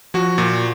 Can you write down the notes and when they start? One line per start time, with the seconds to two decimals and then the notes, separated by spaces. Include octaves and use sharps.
0.14 F3 F#4
0.38 A#2